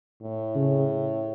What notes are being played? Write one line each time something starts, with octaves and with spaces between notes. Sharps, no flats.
A2
C#3